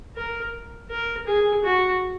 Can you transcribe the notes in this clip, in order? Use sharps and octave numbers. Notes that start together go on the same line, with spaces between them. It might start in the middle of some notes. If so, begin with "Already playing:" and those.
A#4
A#4
G#4
F#4